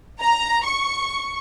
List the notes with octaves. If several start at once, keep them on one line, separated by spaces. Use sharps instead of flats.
A#5
C#6